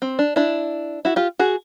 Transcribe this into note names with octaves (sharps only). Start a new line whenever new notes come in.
C4
D4
D4 E4
E4 F#4
F4 G4
F#4 G#4